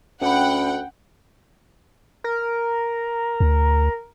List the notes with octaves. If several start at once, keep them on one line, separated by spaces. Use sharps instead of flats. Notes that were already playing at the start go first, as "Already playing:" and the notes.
D2 C#4 F#5 G5 B5
A#4
D2